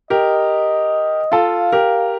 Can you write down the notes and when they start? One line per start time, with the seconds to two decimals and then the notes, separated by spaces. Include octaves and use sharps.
0.10 G4 A#4 D#5
1.32 F4 A4 F5
1.72 G4 A#4